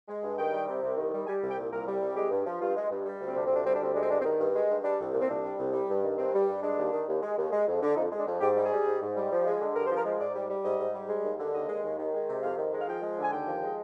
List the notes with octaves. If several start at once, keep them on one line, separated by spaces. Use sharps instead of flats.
G#3
G2
D#3 G5
G3
C3
C2
D#3
G3
G3 G#5
C2
G5
A#2
C2 A#4
G3
C2
G#3 G4
G2
F3
G2 F4
G#3
G2
G3
D2
C4
C3 D4
C4
D2 D4
G3 C4
D4
D2 C4
G#3 D4
C4
G2 D4
C4
D#3
G2
G#3
G2
G3 D4
C2
A#2
C4
C2 D4
G3
C2
G3
G2
D#3
G2 C4
G3
G2
G#3 D4
D#2
D#3
D#2
G#3
D#2
G#3
F2
D3
F2 D#4
G#3
D4
F2
G#2 G4
G3
G#4
G3
G#2
G#2
G3
F3
G#3
D3
G2 A#4
F3 C5
A#4
G#3
G#2 D5
G3
G3
G#2 D#5
G#2
G3
G#3
D#2
D3
D#2 D#5
G#3
D#2
D#3
G#3
C3
F2 F5
D#3
G#3
F5
F3 G5
G#3
D3
G#5
D#2 G5
F3
G#3